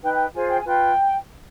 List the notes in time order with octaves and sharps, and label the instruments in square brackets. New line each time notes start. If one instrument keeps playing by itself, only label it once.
[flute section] D#4 B4 G5
G5
F4 G#4 C5 G#5
G5
G#5
F4 B4 G5